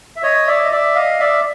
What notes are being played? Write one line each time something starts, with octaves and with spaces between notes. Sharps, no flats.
E5
C#5 D#5
D5 E5
D#5
D5 E5
D#5 F5
D5 E5